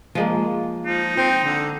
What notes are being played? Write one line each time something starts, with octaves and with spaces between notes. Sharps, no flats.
F3 G#3 A#3
F3 D#4
C4 C5
D3